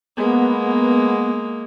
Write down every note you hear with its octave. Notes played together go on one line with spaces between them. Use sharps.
G#3 A#3 B3